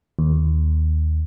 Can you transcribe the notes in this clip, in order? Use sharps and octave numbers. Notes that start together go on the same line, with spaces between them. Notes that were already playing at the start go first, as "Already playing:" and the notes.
D#2